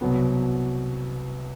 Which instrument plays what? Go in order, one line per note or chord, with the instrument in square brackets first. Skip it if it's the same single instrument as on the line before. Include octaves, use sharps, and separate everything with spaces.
[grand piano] C2 B2 F#3 B3